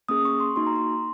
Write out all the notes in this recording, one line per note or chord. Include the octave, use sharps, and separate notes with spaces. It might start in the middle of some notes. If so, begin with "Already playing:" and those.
A#3 C#4 G#4 D#6
C#6
C6
A#3 D#4 F#4 C6
A#5
C6